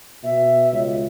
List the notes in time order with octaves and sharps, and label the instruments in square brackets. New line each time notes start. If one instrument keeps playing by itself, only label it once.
[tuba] B2 [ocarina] E5
[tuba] C#2